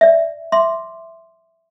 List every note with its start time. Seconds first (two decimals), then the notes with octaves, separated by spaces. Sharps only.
0.01 D5 E5
0.52 E5 C6 D6